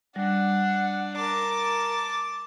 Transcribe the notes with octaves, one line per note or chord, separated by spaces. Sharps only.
G3 D4 F#5
A#4 A5 D6